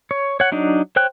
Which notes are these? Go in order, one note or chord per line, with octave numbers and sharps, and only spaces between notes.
C#5
C#5 F#5
F#3 D4 D#4
C5 C#5 G5 F#6